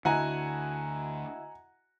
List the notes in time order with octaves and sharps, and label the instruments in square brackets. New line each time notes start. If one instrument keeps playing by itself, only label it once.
[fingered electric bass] D2 D3 [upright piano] E4 F#4 D#5 [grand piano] F#5 G#5 A#5